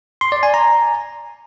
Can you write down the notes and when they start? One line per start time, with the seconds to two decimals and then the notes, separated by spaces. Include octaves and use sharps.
0.21 C6
0.32 D5
0.43 G#5
0.54 A#5